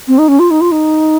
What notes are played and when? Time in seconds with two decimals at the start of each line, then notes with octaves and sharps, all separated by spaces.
0.08 C4
0.18 D#4
0.28 C#4
0.39 F4
0.51 D#4
0.61 F4
0.72 D#4